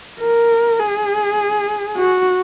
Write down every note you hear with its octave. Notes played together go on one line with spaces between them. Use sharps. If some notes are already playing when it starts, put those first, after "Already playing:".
A#4
G#4
F#4